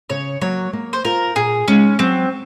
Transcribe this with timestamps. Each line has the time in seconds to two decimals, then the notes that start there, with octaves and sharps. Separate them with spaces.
0.10 C#3 C#5
0.41 F#3 A#3 C#5
0.73 A#3
0.93 C5
1.05 F4 A#4 C5
1.36 A#2 G#4
1.68 G#3 C#4 D#4
1.99 F#3 C4